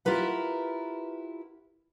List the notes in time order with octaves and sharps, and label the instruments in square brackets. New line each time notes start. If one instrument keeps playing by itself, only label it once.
[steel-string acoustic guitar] E4 F4 G4 A#4 B4 F#5